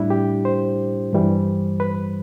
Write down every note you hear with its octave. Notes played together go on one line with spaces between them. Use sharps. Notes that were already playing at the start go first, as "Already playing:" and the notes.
Already playing: A2 G3 D4 E4
G4
C5
G2 E3 G3
B4